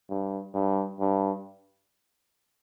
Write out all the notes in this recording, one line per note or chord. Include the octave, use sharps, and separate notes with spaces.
G2
G2
G2